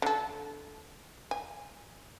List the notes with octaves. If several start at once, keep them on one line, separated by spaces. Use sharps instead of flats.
D3 A4
G#5